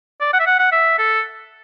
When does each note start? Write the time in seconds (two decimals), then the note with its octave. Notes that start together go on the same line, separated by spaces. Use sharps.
0.21 D5
0.33 F#5
0.40 E5
0.47 F#5
0.59 F#5
0.72 E5
0.98 A4